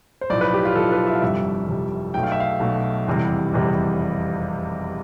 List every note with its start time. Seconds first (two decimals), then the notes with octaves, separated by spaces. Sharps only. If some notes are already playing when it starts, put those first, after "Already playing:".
0.21 C5
0.30 B1 A2 F3 D5
0.41 B4
0.53 G4
0.65 F4
0.76 B1 A2 F3 A4
0.92 B4
1.07 E5
1.15 F5
1.22 G1 F2 C3 G3 E5
1.68 G1 F2 C3 G3
2.14 B1 B2 A3 G5
2.23 F5
2.32 E5
2.40 F5
2.60 B1 B2 A3
3.06 F1 E2 C3 E3 G3
3.52 F1 E2 C3 E3 G3